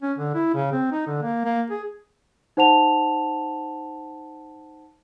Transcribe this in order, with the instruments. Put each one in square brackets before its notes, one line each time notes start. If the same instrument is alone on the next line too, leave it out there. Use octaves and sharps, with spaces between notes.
[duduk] C#4
D3
E4
C#3
C4
D#4
D3
A#3
A#3
G#4
[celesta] D#4 C5 F#5 A5 F7